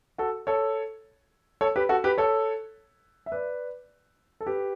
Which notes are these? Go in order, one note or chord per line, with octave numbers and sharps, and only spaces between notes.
F#4 A4
A4 C#5
A4 C#5
G4 B4
F#4 A4
G4 B4
A4 C#5
E5
B4 D5
A4
G4 B4